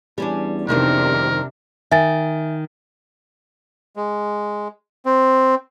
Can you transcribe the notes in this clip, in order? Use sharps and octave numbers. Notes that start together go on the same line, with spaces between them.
E2 G3 C#4 D4
F2 C3 D#3 G3 D4 A#4
D#3 E5 G#5 A6
G#3
C4